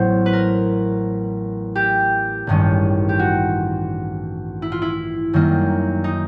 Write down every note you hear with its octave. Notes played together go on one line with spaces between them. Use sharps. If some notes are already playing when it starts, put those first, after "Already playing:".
Already playing: A1 A2 F#3 B3 C5
B4
A#4
G4
A1 G2 D#3 G#3 C#4
G4
F#4
E4
F4
E4
F#2 D#3 G3 A#3
D#4